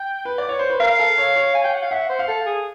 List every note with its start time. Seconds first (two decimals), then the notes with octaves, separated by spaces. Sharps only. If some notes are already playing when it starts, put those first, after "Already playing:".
Already playing: G5
0.25 B4
0.38 D5
0.49 C#5
0.59 C5
0.70 B4
0.80 A#4 F5
0.99 A4
1.18 C#5
1.36 C#5
1.55 G#5
1.64 G5
1.74 F#5
1.83 F5
1.91 E5 F#5
2.09 C5
2.19 F5
2.28 A4
2.46 G#4